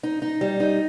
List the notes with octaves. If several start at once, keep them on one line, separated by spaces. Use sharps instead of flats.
D#4
D#4
G3
D#4